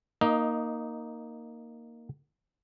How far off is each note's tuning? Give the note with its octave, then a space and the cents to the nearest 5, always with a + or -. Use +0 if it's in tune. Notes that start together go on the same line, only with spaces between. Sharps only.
A#3 +0 D#4 +0 D#5 +20